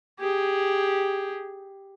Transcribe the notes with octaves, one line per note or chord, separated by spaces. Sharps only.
G4 G#4